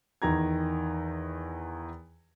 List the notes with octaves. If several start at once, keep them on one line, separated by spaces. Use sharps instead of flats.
E2 D#3 A#5 G#6